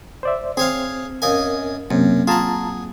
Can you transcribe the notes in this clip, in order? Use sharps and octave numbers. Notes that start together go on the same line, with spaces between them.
C5 D5 E5
C4 G#4 C#5 F5
F#2 A#4 D#5 F5 G#5
F#2 C3 F#3 A#3 C4
F4 G#4 F#5 A5 A#5